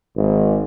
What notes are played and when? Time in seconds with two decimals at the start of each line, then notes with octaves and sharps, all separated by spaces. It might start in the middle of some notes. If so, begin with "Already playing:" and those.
0.16 G#1